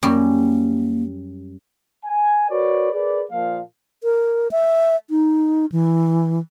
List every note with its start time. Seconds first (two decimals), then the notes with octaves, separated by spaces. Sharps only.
0.03 F#2 G3 A#3
2.05 G#5
2.50 F#4 A#4 B4 C#5 D5
2.93 G#4 A#4 B4 D5
3.32 A#2 F3 F5
4.04 A#4
4.51 E5
5.10 D#4
5.72 E3